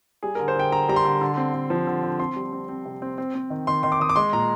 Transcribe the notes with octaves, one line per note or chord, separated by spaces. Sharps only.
G3 G#4
D3 A#4
C5
D3 G5
D3 A#5
G3 A#5
C6
D3
D3
C4
D3
F3
D3
D3
C4 C6
G3
C4
C4
C3
C4
C4
C4
D#3
D#3 C6
D#3 C6
D6
D#3 D#6
D6
G#3 C6
A#2 A#5